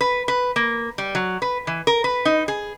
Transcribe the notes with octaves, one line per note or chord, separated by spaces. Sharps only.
B4
B4
A#3
G3
F#3
B4
E3
A#4
B4
D#4
G#4